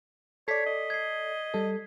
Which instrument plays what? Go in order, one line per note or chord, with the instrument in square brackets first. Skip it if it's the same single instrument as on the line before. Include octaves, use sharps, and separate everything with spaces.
[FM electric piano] A4 D5 [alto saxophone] C#5 [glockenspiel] B6 C7
[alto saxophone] D#5
[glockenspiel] G#6 C7
[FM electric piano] G3 A4